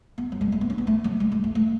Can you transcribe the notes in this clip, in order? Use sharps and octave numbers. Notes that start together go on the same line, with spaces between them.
B3
F#3
G#3
A3
B3
C#4
B3
A3
F#3
G#3
A3
A3
A3